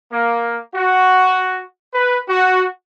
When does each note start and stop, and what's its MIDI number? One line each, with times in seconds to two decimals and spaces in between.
0.12 0.57 58
0.75 1.60 66
1.93 2.19 71
2.28 2.65 66